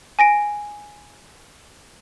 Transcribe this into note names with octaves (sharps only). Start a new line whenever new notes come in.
G#5 A#6 D7